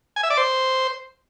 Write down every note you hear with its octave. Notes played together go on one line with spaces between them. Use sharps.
G#5
E5
D5
C5